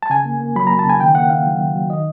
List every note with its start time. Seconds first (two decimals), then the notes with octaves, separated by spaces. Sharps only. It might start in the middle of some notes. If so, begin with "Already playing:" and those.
0.03 A5
0.10 C#3 G#5
0.25 A#3
0.40 A#3
0.56 F#3 B5
0.67 A#3 A#5
0.79 A5
0.85 C#3 G#5
1.00 D#3 G5
1.15 A#3 F#5
1.30 D#3 F5
1.46 F#3
1.60 D#3
1.75 F#3
1.90 D#3 D#5